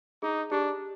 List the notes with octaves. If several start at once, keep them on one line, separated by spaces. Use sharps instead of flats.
D#4 G#4
D4 G4